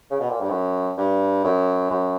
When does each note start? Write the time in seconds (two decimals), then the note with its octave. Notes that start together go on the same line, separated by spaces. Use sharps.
0.11 C#3
0.20 B2
0.30 A#2
0.41 G2
0.50 F#2
0.97 G2
1.44 F#2
1.90 F#2